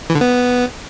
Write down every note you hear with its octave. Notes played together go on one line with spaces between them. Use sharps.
E3
D3
B3